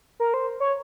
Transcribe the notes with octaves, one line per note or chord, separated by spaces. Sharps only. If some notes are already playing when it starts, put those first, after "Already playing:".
A#4
C5
C#5